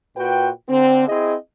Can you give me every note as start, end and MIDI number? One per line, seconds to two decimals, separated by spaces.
0.16 0.49 46
0.16 0.49 66
0.16 0.49 71
0.16 0.49 79
0.69 1.05 50
0.69 1.05 60
1.07 1.35 60
1.07 1.35 64
1.07 1.35 68
1.07 1.35 75